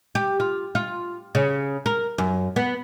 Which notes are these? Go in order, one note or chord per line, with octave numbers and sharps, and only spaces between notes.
G4
F4
F4
C#3
A#4
F#2
B3